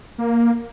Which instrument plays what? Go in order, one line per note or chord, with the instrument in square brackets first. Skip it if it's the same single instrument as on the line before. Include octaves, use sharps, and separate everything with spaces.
[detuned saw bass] A#3